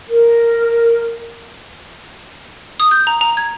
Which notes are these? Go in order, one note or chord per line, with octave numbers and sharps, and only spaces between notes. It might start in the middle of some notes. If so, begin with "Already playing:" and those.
A#4
D#6
G6
A#5
A#5
G#6